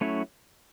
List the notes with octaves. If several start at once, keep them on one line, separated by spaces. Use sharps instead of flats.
F#3 A3 C#4 E4 C#5